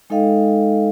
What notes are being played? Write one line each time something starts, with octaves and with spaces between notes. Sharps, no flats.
G#3 D#4 A4 D#5 F5 G5